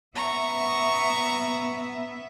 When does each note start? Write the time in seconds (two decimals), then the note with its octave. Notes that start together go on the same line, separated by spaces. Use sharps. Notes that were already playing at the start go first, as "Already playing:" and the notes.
0.15 B3 E5 A#5 C#6